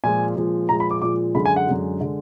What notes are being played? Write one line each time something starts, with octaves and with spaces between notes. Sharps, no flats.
A#2 F3 G#3 G#5
A#2 F3 G#3
A#2 F3 G#3 A#5
B5
D6
A#2 F3 G#3 D6
F#2 D3 G#3 B5
G#5
F#5
F#2 D3 G#3
D3 G#3